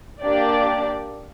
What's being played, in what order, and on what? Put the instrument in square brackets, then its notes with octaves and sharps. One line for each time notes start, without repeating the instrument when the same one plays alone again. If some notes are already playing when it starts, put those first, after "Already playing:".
[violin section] A#3 D4 G4 D5